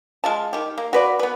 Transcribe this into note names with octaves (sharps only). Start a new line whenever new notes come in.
G#3 F4 A5
D#3 G4
A#3
F#4 B4 D5
B3 B4